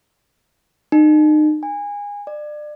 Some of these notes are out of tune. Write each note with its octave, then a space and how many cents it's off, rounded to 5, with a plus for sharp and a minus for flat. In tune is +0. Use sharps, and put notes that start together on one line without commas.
D#4 -35
G#5 -25
D5 +30